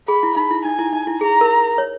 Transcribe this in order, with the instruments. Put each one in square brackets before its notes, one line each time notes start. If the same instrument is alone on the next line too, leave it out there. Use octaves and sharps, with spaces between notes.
[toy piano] G#4 [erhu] B5
[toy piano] E4
[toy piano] D#4 [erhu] B5
[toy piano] E4
[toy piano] D#4 [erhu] G#5
[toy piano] E4
D#4
E4
[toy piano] G#4 [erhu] A#5
[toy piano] A#4
C#5